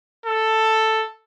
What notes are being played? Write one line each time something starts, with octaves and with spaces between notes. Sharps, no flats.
A4